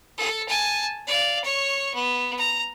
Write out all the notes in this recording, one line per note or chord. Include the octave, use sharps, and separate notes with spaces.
A4
G#5 A5
D5 F5
C#5 C#6
B3
A#5